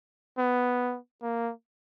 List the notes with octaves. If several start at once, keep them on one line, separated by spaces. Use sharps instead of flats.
B3
A#3